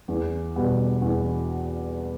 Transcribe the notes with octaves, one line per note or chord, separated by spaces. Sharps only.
E2
B2 G3 B3
E2